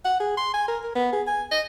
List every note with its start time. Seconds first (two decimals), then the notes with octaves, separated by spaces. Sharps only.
0.05 F#5
0.20 G#4
0.37 C6
0.54 G#5
0.68 A#4
0.84 A#4
0.95 B3
1.13 G#4
1.27 G#5
1.52 D#5